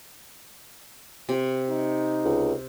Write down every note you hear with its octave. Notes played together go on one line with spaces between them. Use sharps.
C3
D#4
C#2